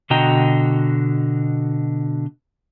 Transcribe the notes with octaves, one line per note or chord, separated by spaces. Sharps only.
B2 D3 F#4 D#5 G5 A#5